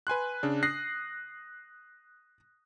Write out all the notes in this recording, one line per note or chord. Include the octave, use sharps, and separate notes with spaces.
B4 G#5 C6 F#6
C#3 D4
D#6 F#6 A#6 C7